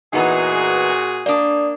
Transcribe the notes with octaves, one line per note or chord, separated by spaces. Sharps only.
A#2 E3 B3 D#4 F#4 G#4
A#3 D4 D5 D#6